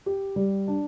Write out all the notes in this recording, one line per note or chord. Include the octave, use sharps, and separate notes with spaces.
G4
G3
D4